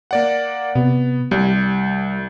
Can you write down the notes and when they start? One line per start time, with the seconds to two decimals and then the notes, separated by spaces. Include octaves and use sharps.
0.11 A#3 D5 F#5
0.75 C3 B3
1.31 C2 G3